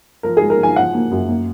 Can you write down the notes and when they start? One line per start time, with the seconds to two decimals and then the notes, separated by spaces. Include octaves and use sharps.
0.23 F3 A#4
0.37 G#4
0.42 G#3
0.50 A#4
0.59 F3 G#5
0.76 F3 F#5
0.94 A#3
1.11 F#2
1.29 A#3